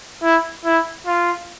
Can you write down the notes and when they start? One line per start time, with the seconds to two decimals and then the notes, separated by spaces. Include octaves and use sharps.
0.23 E4
0.65 E4
1.06 F4